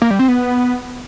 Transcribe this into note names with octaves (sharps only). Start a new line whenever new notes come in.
A#3
G3
C4
B3